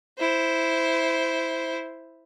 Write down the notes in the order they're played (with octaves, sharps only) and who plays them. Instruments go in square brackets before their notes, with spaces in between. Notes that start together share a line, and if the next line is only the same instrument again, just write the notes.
[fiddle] E4 C5